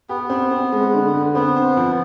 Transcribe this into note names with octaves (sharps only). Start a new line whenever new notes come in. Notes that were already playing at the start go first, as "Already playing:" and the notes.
B3 G4
C4
C4
G#3
D3
D3
B3 C4
C5
F3